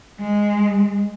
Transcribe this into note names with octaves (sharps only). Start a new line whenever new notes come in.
G#3